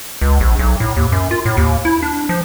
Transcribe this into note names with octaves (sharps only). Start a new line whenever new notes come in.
C#2
A#1
B1
A2
D#2
F#2
F4
A2
D#2
E4
D4
F3